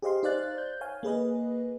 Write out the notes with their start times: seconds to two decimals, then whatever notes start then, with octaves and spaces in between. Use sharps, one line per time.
0.02 G4 G#4 C5 D#5 F5 C6
0.23 D#4 C5 D5 F5 F#6 A6
0.58 G6
0.81 C#5 F5 G#5
1.03 A#3 G#4 B4 D#5